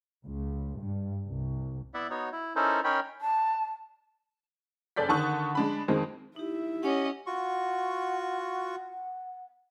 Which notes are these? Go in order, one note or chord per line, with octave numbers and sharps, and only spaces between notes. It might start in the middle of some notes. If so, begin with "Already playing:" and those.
C#2
G2
C2
B3 E4 D5 E5 F#5
B3 D#4 F#4 C#5
E4
C#4 D#4 E4 A4 A#4 C5
C#4 D#4 A#4 C#5 G5 B5
A5
F#1 A4 D5 G6 B6
D3 D#3 A5 C#6 D#6 F#6
G#3 D4 B5
F2 D#3 G#3 C4
D#4 E4 G4 E5
C#4 G4 C#5 D#5 F#5
F4 F#4 F#5 C#6